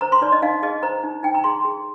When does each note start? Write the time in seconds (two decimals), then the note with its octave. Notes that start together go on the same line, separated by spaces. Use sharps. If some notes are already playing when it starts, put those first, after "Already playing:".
0.01 C5 A#5
0.12 C6
0.22 D#4 D5
0.32 D#5
0.42 D#4 F5
0.62 G#4 D#5
0.83 C5 A#5
1.03 D#4
1.23 D#4 G5
1.34 A#5
1.44 G#4 C6
1.65 G#4